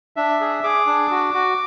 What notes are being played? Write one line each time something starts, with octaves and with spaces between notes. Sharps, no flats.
D4 E5
G#4
G#4 D6
D4
F#4
F#4